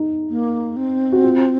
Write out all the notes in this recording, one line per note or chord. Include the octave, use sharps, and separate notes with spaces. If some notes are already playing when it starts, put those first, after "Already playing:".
Already playing: D#4
A#3
C4
F#4
F4